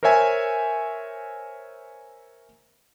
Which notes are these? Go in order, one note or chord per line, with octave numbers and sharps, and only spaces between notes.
A#4 C5 C#5 E5 G#5